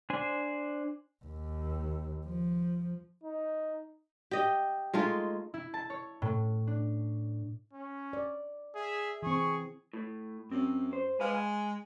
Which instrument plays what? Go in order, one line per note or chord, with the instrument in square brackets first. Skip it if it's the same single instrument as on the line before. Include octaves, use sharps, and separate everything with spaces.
[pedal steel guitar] D4 C5 G#5
[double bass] D#2
F3
[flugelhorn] D#4
[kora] G4 D#5
G#3 A3 D#4 F4
[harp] E4
A5
C#5
A2
D4
[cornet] C#4
[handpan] D5
[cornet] G#4 [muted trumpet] E5
[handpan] E3 C4 [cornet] G#4 [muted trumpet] C#6
[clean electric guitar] A2
[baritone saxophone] F#2 [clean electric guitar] C4
[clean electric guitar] C5
[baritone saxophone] G#3 [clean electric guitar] B4 F5
[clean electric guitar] G#5